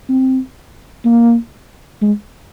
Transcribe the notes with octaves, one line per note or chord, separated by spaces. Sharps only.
C4
A#3
G#3